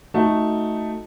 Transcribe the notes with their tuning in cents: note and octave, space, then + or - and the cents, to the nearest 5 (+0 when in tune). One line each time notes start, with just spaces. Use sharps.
A3 +0 D#4 +5 F#4 -15